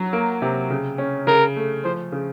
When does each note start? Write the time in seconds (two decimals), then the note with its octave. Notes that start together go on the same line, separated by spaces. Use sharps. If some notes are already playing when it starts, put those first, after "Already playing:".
Already playing: F#3
0.13 A#3
0.42 C3
0.70 C#3
0.98 C#4
1.27 C#3 A#4
1.56 A3
1.84 F3 C5
2.12 C#3